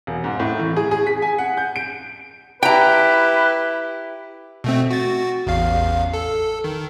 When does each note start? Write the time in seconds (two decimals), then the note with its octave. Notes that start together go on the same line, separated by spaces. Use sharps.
0.07 E1
0.24 G#2
0.40 A2
0.59 E3
0.76 G#4
0.91 G#4
1.07 B6
1.22 G#5
1.38 F#5
1.57 G6
1.76 D7
2.63 E4 G4 B4 G5 A#5
4.64 B2 A3 C4
4.91 F#4 A6
5.47 A1 E2 F5
6.14 A4
6.64 D#3